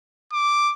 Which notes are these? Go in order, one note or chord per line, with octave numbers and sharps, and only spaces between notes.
D6